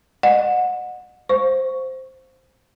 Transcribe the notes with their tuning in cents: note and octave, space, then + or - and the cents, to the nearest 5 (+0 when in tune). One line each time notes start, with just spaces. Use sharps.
D#5 -30 F#5 -25
C5 +0 F5 +25 C#6 +5